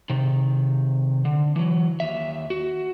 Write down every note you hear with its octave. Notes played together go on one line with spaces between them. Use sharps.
C3 D#3
D3
E3 F#3
D#2 E5
F#4